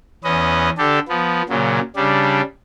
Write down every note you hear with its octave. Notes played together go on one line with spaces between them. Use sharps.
E2 C#4 B4 D#5
D3 D4 G4 A4
F3 B3
A#2 C#3 F#3
C#3 G3 D4